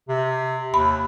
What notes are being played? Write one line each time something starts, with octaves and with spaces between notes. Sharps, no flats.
C3
D#2 B5